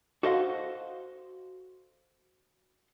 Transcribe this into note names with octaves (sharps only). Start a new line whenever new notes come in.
F#4 A4 C5 D#5 F5 F#5